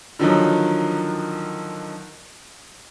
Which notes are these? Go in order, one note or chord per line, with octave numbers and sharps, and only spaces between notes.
D3 D#3 F3 F#3 D#4